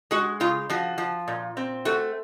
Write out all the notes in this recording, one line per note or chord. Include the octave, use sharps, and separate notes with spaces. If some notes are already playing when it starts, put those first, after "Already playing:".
G#3 F#4
C#3 F4
F3 F#4
F3
A#2
C4
A3 F#4